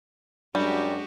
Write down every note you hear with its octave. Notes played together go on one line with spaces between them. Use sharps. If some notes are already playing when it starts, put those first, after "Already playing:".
F#2 G3 G#3 D4 F#4 G4